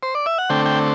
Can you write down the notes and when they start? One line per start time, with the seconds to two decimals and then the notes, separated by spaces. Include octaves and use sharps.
0.03 C5
0.15 D5
0.26 E5
0.38 F#5
0.49 D3 A3 C4 G5
0.66 G5